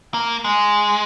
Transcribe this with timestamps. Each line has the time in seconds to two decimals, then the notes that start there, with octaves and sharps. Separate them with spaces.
0.14 A#3
0.44 G#3